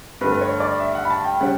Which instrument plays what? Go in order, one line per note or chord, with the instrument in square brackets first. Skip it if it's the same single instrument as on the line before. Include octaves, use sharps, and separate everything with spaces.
[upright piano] G2 B4
D3 A3
B4
C#5
D5
E5
F#5
B5
A5
G5
C#3 G3 C#4 F#5